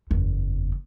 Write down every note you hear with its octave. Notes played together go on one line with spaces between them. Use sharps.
F#1 E2